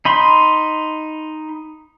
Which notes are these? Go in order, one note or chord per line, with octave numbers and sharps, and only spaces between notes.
D#4 B5 C6